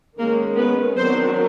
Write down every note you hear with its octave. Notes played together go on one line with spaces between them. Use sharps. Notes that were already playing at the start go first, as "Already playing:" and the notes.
D#3 G#3 A#3 C#4 A#4
B3 B4
D#3 F#3 B3 C4 D4 C5